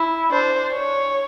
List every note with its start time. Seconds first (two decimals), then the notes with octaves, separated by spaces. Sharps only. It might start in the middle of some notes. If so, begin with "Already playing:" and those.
Already playing: E4
0.32 D4 C5
0.72 C#5